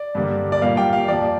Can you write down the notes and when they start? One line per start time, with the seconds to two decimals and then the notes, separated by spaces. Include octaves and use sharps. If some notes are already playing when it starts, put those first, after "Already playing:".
Already playing: D5
0.15 G2 D3 G3 A#3
0.52 D5
0.62 A#2 G3 A#3 F5
0.77 G5
0.93 F5
1.08 F2 F3 A#3 D5